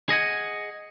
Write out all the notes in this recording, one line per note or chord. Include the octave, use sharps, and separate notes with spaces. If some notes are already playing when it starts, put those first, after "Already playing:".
G#4 D#5 F#5 G#5